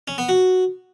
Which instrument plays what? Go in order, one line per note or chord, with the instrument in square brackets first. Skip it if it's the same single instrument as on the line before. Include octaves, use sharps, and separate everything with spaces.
[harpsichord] C#4
B3
F#4